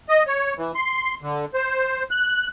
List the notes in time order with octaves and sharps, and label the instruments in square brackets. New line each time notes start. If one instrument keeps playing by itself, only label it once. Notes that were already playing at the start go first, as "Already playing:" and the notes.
[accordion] D#5
C#5
E3
C6
D3
C5
F#6